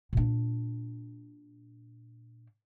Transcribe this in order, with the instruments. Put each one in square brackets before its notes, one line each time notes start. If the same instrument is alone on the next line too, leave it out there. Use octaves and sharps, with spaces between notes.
[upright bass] A#2 D4